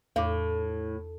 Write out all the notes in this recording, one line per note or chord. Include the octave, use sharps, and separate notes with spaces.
E2 A2 D6